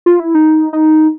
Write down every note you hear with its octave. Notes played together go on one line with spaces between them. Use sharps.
F4
E4
D#4
D#4